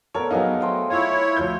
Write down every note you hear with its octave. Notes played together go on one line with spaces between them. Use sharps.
B3 A4 A#4 C#5 D5
F#3 B3 D#4 G#4 D#5 F5
A3 C5 G5
E4 F4 C#5
D2 F3 G6